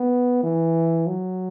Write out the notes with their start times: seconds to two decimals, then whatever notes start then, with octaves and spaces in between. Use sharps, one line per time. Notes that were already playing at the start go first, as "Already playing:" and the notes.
Already playing: B3
0.43 E3
1.07 F#3